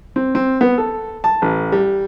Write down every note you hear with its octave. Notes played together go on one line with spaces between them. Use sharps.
C4
C4
B3
A4
A5
A1
G3